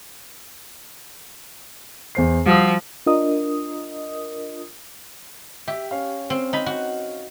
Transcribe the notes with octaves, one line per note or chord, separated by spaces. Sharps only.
E2 C5 C7
F3 G3 F#4 D#6 E6
D4 F4 A#4 D#5 D#6
G4 E5
C#4 F5
C4
D#4 B5
F#4